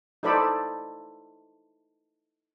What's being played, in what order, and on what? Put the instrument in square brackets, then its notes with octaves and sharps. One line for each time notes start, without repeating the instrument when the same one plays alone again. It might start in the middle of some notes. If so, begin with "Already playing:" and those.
[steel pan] D#4 E4 A4 C5 D5 B5